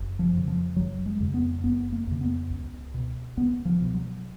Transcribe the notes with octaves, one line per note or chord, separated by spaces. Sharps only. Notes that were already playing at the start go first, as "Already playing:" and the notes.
Already playing: F#1
F3
F2 C#3
F3
F#1 F#3
G#3
F2 C#3
B3
F#1 B3
A#3
F2 C#3
B3
C#2
B2
C#2 B3
F3
B2
F#3